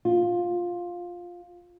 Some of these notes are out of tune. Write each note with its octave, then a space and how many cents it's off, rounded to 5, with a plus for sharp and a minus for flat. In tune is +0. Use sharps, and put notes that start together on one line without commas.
F4 +10